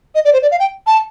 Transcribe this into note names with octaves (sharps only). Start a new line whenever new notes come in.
D#5
D5
C5
D5
F5
G5
A5